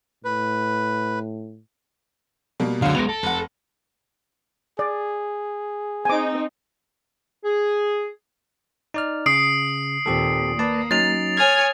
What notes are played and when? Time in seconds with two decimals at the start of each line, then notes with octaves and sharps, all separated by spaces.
0.25 A2 B4
2.60 B2 G3 A#3
2.82 C#2 D3 F#3 F5
2.95 G#3 B3 A#6 D7 F7
3.09 A4
3.23 F1 F#5
4.79 G#4 D5
6.05 C4 D#4 G#5 D6
7.44 G#4
8.94 D#4 D5 F6
9.26 C#3 D#6 C7 D7
10.06 D#2 A#2 C4 G4 A4
10.59 A#3 B4 D5 A5
10.91 F#3 C#4 D#4 A6 F7
11.37 C#5 G#5 F6 G#6